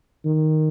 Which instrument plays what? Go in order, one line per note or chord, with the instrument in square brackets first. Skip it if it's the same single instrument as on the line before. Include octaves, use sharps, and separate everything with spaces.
[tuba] D#3